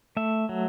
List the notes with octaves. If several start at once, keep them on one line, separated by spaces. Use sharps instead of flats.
A3 E5
F#3